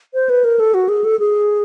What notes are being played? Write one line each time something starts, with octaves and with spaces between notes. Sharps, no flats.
C5
B4
A#4
A4
F#4
G#4
A4
G#4